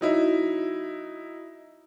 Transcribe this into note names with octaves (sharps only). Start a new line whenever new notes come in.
F#3 D#4 E4